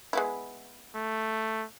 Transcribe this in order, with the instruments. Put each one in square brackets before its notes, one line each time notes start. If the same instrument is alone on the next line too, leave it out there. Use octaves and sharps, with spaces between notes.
[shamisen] G#3 B3 E4
[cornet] A3